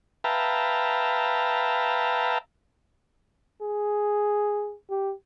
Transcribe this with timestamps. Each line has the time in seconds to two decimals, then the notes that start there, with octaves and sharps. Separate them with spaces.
0.24 B4 E5 F5 G5 A5 A#5
3.62 G#4
4.90 G4